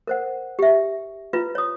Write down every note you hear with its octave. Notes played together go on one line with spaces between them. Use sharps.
A#4 C5 F#5
G4 E5
E4 F4 B4
C#5 D#6